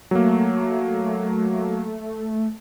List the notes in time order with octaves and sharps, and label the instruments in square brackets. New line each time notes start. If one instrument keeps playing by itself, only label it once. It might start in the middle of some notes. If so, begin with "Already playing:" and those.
[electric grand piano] F#3 A#3 [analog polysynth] A3